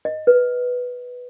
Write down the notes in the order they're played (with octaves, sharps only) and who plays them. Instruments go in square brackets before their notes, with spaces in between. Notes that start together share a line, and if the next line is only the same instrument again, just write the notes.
[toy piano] D#5
B4